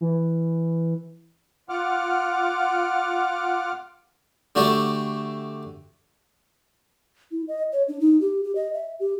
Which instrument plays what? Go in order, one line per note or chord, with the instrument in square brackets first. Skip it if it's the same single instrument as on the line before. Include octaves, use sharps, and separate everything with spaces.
[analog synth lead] E3
[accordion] F4 F#5 D6 F6
[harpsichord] D3 A3 D4 F#4 G4 A4
[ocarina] E4
D#5
C#5
D4
D#4
G4
G4
D#5
E5
G4